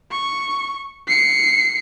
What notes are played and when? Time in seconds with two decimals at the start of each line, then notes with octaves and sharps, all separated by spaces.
0.11 C#6
1.07 C7 C#7